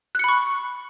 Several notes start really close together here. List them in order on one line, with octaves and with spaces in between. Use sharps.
F#6 C#7 B5 C#6